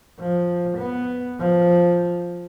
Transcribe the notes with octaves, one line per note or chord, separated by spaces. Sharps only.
F3
B3
F3